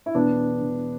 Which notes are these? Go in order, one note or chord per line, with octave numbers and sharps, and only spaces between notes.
E4
E1 B3 D4
E1